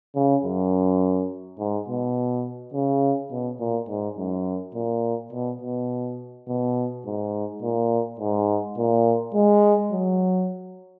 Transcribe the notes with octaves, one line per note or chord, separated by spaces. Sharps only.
C#3
F#2
G#2
B2
C#3
B2
A#2
G#2
F#2
A#2
B2
B2
B2
G#2
A#2
G#2
A#2
G#3
F#3